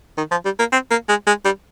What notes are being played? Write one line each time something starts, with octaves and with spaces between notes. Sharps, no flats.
D#3
F3
G3
A#3
C4
A#3
G#3
G#3
G3